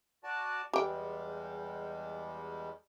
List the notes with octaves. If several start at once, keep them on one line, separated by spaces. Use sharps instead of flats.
F#4 D5 A5
E2 G3 G#3 G4 G5